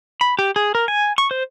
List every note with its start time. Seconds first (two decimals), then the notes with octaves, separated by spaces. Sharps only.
0.21 B5
0.39 G4
0.56 G#4
0.75 A#4
0.88 G#5
1.18 C#6
1.31 C5